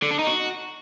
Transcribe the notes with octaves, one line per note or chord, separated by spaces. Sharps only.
D3
D4
D#4
F#4